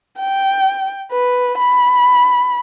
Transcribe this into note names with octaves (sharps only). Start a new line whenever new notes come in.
G5
B4
B5